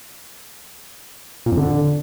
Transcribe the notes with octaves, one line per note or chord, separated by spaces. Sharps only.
A#2
F2
D3